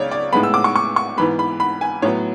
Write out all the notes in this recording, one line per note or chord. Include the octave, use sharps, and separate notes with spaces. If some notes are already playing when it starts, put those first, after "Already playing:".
Already playing: C#2 C#3 B3 C#5 D5
D5
A2 G#3 B3 B5
E6
D6
C#6
C#6
C#6
G#2 E3 B3 B5
B5
B5
G#5
A2 F#3 B3 C#5